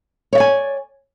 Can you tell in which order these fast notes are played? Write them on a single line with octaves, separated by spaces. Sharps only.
C#5 E5 D5 G#5